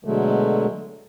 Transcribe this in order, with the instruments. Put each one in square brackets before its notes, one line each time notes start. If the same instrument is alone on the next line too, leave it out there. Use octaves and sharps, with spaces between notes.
[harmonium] B2 D3 F#3 G#3 A3